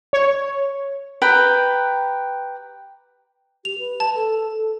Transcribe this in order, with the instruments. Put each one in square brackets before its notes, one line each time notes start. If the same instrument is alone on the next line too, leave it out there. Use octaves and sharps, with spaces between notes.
[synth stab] C#5
[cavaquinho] G4 B4 G5 A#5
[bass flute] G4 [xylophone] F7
[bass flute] B4
[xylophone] A5
[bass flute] A4
A4